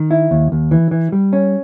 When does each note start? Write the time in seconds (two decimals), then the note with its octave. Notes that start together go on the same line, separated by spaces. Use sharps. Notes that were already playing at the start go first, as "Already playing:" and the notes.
Already playing: D#3
0.11 E4
0.31 D#2
0.52 D#2
0.71 E3
0.91 E3
1.12 G3
1.33 C#4